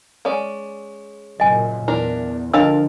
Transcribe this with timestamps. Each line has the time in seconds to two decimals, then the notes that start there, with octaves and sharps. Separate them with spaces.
0.25 G#3 C#4 D5
1.40 F#1 F#2 A#2 D#5 G#5
1.88 E2 D4 E4 A#4
2.53 D3 F3 D4 A#4 D#5 F5 A5 E6